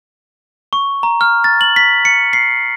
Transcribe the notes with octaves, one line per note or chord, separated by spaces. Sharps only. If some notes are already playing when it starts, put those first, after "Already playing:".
C#6
A#5
F6
A6
F#7
B6
C#7
C7